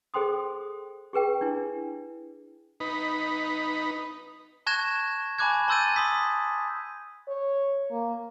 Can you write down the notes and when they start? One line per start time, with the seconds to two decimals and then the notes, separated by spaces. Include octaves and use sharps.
0.14 G#4 A4 C5 G5 C6 D#6
1.13 G4 G#4 B4 G5
1.41 D4 E4
2.80 D#4 B4
4.66 A5 C#6 F#6 G#6 A#6 E7
5.38 G#5 A5 B5 D6 F#6 G#6
5.68 A5 C6 E6 G6 A6 D#7
5.96 A5 C6 D#6 B6
7.28 C#5
7.91 A#3